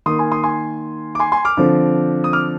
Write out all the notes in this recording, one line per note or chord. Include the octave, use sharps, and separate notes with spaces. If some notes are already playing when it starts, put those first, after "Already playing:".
D#3 A#3 C6 D#6
G#5 C6
C6 D#6
G#5 C6
D6
G#5 C6
G#5 C6
D6 F6
D3 F3 C4
D#6
D6 F6